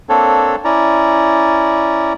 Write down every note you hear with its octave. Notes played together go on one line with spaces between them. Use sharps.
A#3 C4 D4 A4 C#5
C#4 E4 D5 A#5